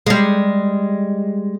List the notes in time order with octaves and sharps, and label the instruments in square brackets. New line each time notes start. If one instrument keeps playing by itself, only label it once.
[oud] G3 G#3